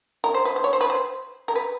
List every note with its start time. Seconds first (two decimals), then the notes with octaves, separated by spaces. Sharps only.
0.24 A#4
0.34 C5
0.45 B4
0.56 C5
0.64 C#5
0.73 C5
0.81 B4
0.90 C5
1.48 A#4
1.55 B4